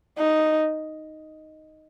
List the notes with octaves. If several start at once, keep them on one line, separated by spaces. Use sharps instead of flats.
D#4